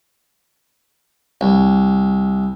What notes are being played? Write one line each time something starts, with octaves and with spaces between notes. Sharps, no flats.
C2